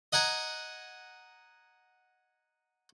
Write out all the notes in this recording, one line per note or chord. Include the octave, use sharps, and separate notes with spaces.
D#5 F#5 G#5 A#5